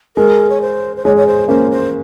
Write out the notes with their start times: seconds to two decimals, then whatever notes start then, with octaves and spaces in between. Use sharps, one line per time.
0.16 G#3 A#4
0.49 C#5
0.61 C5
0.96 C5
1.04 G#3 C#5
1.16 C#5
1.26 C5
1.48 A#3 C#4 C5
1.71 C5